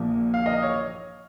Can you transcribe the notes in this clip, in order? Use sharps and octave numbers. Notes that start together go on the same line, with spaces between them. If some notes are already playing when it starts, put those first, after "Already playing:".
Already playing: A#1 A#2 F3
F5
D#5
C#5